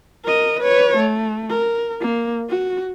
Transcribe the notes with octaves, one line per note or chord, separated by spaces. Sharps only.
A#4 D#5
B4 C#5
A3
A#4
A#3
F#4